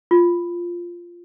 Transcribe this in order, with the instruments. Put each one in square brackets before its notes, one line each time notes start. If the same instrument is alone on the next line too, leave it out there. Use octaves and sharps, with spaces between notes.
[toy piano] F4